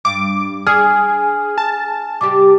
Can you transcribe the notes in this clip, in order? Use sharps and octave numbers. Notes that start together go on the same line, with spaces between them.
G2 D6
D4 G#4 G#5 F6
A5
C3 G3 G4 D6